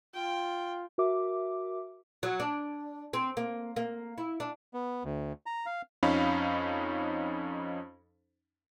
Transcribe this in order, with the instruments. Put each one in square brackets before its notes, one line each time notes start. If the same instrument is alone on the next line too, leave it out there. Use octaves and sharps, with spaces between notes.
[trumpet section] F4 [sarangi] G5
[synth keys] F#4 A#4 E5 D6
[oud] F#3
D4
C4
A#3
A#3
E4
D4
[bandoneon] B3
D2
A#5
F5
[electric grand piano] F2 C#4 D#4 F5 B5